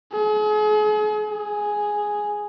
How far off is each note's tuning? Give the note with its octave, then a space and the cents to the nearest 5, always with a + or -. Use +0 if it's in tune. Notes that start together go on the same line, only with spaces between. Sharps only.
G#4 +40
G#4 +0